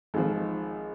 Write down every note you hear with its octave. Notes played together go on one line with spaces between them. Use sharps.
G#1 F3